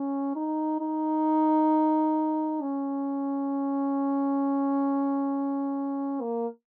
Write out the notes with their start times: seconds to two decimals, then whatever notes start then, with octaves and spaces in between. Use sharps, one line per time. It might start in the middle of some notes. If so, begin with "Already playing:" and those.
Already playing: C#4
0.36 D#4
0.81 D#4
2.62 C#4
6.21 A#3